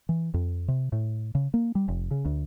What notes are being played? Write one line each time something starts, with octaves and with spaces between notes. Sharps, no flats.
E3
F2
C3
A2
C#3
A#3
G3
F1
C#3
D2